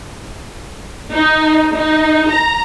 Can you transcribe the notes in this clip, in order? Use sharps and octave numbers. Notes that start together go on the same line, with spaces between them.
D#4
D#4
A#5